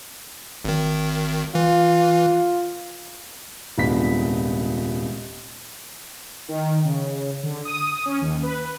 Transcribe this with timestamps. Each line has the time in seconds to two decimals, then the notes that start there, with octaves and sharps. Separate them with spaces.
0.65 G#1 D#3
1.55 E3 F4
3.78 D#1 C2 G#2 B3 D4 B6
6.49 D#3
6.85 C#3
7.43 D3
7.65 D#6
8.06 C#4
8.22 D#2
8.43 B4